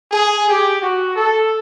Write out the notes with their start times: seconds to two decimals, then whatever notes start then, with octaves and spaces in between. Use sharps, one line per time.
0.12 G#4
0.50 G4
0.82 F#4
1.16 A4